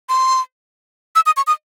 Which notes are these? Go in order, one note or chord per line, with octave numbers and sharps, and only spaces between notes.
C6
E6
D#6
C#6
D#6